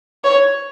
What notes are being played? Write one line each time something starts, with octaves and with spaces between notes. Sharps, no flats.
C#5